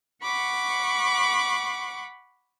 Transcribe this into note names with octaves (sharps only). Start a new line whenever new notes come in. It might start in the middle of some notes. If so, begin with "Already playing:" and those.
F#5 B5 C#6 D6